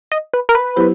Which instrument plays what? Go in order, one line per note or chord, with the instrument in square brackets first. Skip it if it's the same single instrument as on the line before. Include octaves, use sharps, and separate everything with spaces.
[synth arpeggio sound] D#5
B4
A#4
B4
[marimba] F#3 B3 E4 G4 C5